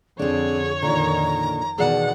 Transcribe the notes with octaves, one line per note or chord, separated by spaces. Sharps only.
F2 D3 C4 D4 G#4 C#5
F2 A#2 D3 D#3 A#5
E2 B2 D#3 G#4 D5 F#5 A5